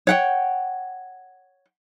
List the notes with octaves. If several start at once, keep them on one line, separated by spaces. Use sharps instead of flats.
C#5 F#5 G5